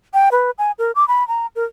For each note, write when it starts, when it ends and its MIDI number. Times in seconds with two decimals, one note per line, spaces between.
0.14 0.29 79
0.32 0.51 71
0.58 0.72 80
0.79 0.92 70
0.95 1.07 86
1.08 1.26 83
1.28 1.47 82
1.56 1.65 70